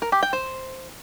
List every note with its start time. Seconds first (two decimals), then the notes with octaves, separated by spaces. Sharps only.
0.02 A#4
0.12 G4
0.23 G5
0.33 C5